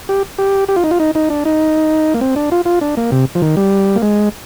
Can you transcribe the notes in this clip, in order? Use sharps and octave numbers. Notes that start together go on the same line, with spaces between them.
G4
G4
G4
F4
D#4
F4
D#4
D#4
D4
D#4
A#3
C4
D4
F4
F4
D4
A#3
C3
F3
D#3
G3
A#3
G#3